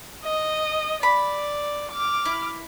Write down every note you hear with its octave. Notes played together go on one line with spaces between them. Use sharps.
D#5
D5 B5
D6 F6
E4